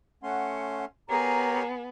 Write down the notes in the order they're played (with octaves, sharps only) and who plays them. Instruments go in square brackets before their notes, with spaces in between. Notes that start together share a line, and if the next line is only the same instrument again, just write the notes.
[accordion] A3 C#4 C6 [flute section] F#5
[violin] B3 [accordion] G4 A#4 C#5 [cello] G#4 [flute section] A#5